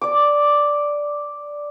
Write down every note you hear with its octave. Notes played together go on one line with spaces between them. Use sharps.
D5 D6